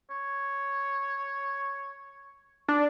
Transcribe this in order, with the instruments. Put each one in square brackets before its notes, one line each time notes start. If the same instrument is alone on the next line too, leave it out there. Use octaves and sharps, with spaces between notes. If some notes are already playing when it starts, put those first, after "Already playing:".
[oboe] C#5
[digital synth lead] D4